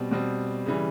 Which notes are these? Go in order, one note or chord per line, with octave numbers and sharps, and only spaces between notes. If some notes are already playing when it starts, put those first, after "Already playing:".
Already playing: B2 G3 C4
B2 G3 C4
C#3 E3 G3